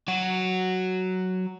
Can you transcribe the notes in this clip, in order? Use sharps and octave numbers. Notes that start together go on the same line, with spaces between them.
F#3 F#4